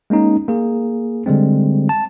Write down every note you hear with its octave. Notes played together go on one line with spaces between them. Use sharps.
G#3 A#3 C#4 D#4
A#3 G#4
D3 G3 G#3 C4
A5